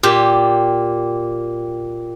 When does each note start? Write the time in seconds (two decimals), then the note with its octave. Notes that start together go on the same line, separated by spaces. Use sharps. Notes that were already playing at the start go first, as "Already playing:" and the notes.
0.03 A#2 G4